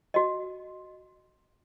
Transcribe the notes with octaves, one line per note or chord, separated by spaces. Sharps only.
F#4 D#5